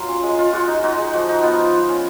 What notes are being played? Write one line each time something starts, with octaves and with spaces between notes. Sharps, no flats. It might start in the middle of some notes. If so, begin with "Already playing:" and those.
Already playing: F#3 F4 A#4
C#4
G#3
F4
G#3 F#4
D#4
D#4 F#4
G#3
F3 F#4
D#4
B3 F4
F3
F4
C#4